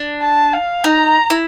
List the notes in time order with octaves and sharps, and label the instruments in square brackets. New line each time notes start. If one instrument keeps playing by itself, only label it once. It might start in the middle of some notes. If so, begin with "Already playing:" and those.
Already playing: [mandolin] D4
[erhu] A5
F5
[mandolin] D#4 [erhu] A#5
[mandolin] E4